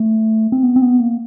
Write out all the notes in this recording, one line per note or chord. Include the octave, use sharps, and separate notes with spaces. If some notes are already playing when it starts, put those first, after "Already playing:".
Already playing: A3
C4
B3
C4
B3
A#3